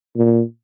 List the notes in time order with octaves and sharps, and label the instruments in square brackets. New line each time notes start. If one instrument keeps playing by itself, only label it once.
[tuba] A#2